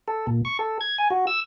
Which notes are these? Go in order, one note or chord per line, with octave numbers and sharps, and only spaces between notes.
A4
A#2
C#6
A4
G#6
G#5
F#4
E6